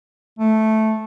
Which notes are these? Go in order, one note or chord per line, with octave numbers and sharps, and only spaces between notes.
A3